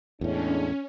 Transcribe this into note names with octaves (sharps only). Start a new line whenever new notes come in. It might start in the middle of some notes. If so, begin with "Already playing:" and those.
E2 A2 G#3 C#4 D4